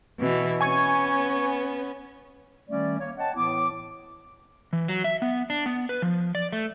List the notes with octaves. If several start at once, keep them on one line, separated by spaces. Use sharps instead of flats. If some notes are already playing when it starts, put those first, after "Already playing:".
B2 E3
B3 C#4 G#5 C#6 G#6
D#3 G3 A3 C#4 D5
A#3 C#5
C#5 D#5 F#5 G5 A5
A2 E3 B3 E4 D6
E3
F#3
E5
B3
D4
B3
B4
F3
D5
A3